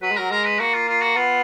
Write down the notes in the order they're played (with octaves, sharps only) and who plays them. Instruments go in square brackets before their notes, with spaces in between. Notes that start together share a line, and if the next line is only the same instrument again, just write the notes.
[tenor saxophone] F#3 [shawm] B4
[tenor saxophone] G#3
[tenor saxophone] F#3 [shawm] A#4
[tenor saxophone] G#3 [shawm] A#4
[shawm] B4
[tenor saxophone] A#3 [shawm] F#4
[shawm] F4
F4
F#4
[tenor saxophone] B3 [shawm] F4